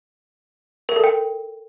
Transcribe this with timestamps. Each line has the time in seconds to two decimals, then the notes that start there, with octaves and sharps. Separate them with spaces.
0.89 A#4
0.96 A4
1.04 G5